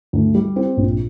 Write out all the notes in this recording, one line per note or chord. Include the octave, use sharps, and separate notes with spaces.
D2
G3
C4
A#1